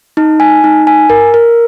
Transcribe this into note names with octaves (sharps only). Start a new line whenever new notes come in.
D#4
G#5
D#4
G#5
A#4
A#4